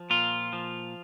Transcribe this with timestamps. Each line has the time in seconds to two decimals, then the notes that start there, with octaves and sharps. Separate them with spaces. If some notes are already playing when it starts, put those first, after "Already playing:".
Already playing: F3
0.10 A#2 F4
0.53 F3